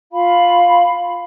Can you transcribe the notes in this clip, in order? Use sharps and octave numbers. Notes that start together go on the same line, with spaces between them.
F4 F5 B5